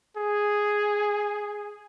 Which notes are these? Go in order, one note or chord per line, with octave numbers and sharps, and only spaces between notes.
G#4